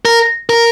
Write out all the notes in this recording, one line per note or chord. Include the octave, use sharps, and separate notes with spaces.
A#4
A#4